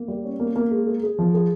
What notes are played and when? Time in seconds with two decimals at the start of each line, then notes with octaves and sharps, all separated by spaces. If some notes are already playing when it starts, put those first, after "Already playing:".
Already playing: A#3
0.08 G3
0.24 C#4
0.40 A#3
0.56 A#3
0.71 G#3
0.87 G#4
1.03 G#4
1.19 F3
1.34 G#4